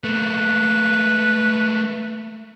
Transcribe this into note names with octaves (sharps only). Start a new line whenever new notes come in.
A3 A#3 B4